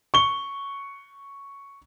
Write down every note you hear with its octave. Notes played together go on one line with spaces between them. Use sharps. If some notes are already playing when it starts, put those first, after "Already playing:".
C#6 G7